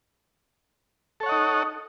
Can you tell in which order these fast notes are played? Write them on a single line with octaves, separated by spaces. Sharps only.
A4 C#5 F#5 D#5 D#4